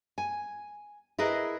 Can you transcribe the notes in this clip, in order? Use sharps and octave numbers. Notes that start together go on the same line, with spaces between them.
G#5
E4 G#4 A#4 B4 D#5